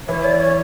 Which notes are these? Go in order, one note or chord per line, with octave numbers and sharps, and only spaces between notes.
E3 E4 C#5
D5
C#5